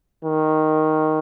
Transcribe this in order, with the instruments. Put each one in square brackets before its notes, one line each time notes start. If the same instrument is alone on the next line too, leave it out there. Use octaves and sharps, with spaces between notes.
[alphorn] D#3